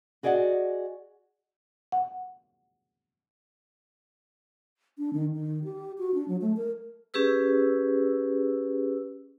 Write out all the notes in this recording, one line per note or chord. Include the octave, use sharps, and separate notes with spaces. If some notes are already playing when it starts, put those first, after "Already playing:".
F#4 G#4 D5 D#5 F5 F#5
F#5
D4
D#3
D#3
G4
F#4
D4
F#3
A3
A#4
C#4 G4 G#4 B4 E6